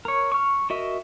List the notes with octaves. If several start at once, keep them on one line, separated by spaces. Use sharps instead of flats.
A#4 C#5
C#6 F6
F#4 A#4 D#5 E5